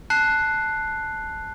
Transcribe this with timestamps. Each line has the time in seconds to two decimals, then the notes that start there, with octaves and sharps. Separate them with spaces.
0.10 A5 F#6 C7